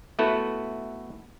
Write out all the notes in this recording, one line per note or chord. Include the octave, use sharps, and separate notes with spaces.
A3 B3 E4 F#4 A4 B4